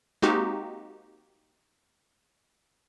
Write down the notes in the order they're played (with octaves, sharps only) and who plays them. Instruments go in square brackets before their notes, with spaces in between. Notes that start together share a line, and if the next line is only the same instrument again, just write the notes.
[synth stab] G#3 A#3 C4 D#4 F#4 G4